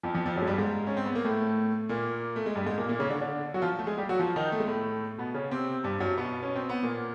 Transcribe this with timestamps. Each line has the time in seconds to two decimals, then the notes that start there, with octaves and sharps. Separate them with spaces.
0.03 F2 F3
0.14 F2 F3
0.26 F2 F3
0.36 F#2 F#3
0.42 G#3
0.47 G2 G3
0.58 G#2 G#3
0.87 C#4
0.97 C4
1.06 B3
1.15 A#3
1.25 A2 A3
1.89 A#2 A#3
2.36 A3
2.46 G#3
2.55 G2 G3
2.66 G#2 G#3
2.77 A#2 A#3
2.88 A#2 A#3
2.99 C#3 C#4
3.10 D3 D4
3.21 D3 D4
3.54 F#3 F#4
3.62 F3 F4
3.79 A3 A4
3.87 G#3 G#4
3.97 G3 G4
4.09 F#3 F#4
4.19 F3 F4
4.36 D#3 D#4
4.52 A3
4.60 G#3
4.67 A2 A3
5.18 B2 B3
5.34 C#3 C#4
5.51 C3 C4
5.84 G2 G3
6.00 F#2 F#3
6.17 B2 B3
6.43 C#4
6.56 C4
6.69 B3
6.83 A#2 A#3